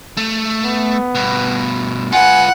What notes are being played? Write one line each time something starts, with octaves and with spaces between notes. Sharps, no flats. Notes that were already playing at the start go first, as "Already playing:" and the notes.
A3
B3
G2 B2
F4 B4 F#5 G#5